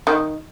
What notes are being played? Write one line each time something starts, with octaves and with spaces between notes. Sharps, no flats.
D#3